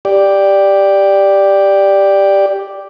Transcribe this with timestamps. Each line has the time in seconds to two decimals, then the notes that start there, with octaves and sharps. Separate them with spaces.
0.05 G4 D5